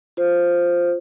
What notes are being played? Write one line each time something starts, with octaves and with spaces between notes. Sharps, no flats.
F4 C5